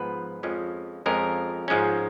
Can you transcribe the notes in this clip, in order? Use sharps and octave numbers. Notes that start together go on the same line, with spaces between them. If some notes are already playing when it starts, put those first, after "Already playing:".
Already playing: G#2 F3 G#3 B3 B4
F2 F3 G#3 C#4
F2 F3 G#3 C#4 A#4
G#2 F3 G#3 C#4